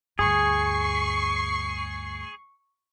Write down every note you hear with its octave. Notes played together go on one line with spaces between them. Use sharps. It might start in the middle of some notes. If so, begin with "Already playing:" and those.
D2 G2 G#4 C#6 C7